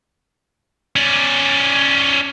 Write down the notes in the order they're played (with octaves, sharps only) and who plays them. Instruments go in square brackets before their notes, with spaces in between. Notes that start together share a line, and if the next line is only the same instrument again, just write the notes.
[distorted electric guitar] C#4 D5